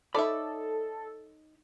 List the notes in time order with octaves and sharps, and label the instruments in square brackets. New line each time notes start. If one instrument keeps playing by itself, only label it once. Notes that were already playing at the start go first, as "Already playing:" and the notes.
[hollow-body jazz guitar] D#4 C#5 B5 [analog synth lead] A4 [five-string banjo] D5 E5